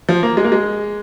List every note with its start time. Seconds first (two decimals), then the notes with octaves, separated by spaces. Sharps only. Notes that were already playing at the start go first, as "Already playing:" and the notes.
0.09 F3
0.23 A#3
0.37 G#3
0.44 A#3
0.52 G#3